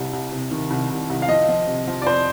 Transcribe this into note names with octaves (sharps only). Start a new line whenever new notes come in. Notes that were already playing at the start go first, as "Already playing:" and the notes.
Already playing: C2 G3
C2
C3
D#3
C2
C2
C2
F5
F3 D#5
F3
C3
F3
D5
F2 C5